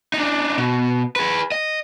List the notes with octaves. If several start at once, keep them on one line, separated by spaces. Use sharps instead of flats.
D4 D#4
B2
G#4 B4
D#5